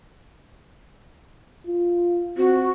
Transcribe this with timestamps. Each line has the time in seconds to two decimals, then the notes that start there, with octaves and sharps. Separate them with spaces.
1.67 F4
2.38 C4 F#4